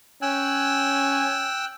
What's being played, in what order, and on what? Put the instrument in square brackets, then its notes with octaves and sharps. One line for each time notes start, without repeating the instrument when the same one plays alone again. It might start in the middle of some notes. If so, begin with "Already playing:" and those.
[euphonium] C#4 [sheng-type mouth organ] G5 E6 F#6 [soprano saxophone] G#5